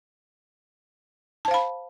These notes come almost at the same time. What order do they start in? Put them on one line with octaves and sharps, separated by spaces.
A5 C5 F5 B5